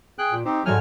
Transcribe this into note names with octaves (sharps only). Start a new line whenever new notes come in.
G#4 G5 F#6
A#2
C4 D#4 G4 C5
G#2 F#3 G3 A3 G#5 F6